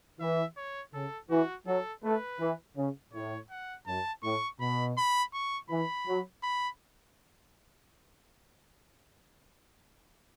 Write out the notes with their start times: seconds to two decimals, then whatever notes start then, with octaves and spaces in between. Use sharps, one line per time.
0.20 E3 E5
0.57 C#5
0.94 C#3 A4
1.30 E3 F#4
1.67 F#3 A4
2.04 A3 B4
2.40 E3
2.77 C#3
3.13 A2 C#5
3.50 F#5
3.87 F#2 A5
4.23 A2 C#6
4.60 B2 B5
4.98 B5
5.33 C#6
5.70 E3 B5
6.07 F#3
6.43 B5